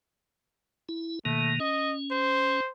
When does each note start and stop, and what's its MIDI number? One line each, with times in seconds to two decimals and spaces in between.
0.89 1.19 64
1.25 1.60 47
1.25 1.60 51
1.25 1.54 57
1.25 1.60 58
1.60 2.61 61
1.60 1.94 75
2.11 2.70 72